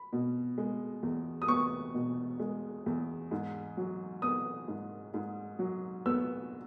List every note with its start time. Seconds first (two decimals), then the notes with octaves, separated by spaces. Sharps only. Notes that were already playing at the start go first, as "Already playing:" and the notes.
Already playing: B5
0.13 B2
0.58 G#3
1.03 E2
1.42 D#6
1.48 B3 C#6
1.94 B2
2.40 G#3
2.86 E2
3.31 G#2
3.77 F#3
4.22 B3 D#6
4.68 G#2
5.14 G#2
5.59 F#3
6.06 B3 E6